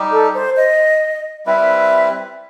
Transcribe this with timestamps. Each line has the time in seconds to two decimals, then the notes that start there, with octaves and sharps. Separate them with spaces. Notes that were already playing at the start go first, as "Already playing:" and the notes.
Already playing: G3 D#4 G4
0.11 A4
0.34 C5
0.57 D#5
1.46 G3 C4 E4 B4 E5